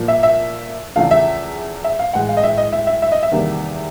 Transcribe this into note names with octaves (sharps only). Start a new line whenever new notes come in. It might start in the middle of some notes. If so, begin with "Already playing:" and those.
Already playing: A#2 F3 A#3
E5
E5
E2 C#3 F3 A3 F5
E5
E5
F5
A2 E3 G#3 F#5
F5
D#5
E5
D#5
E5
E5
E5
D#5
E5
E2 C3 D#3 G3 A#3